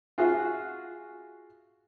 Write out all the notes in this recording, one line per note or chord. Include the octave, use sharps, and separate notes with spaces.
F4 F#4 G#4 E5 F5